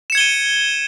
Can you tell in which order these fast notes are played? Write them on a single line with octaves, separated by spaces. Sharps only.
E7 C#7 G#6 G7 D#7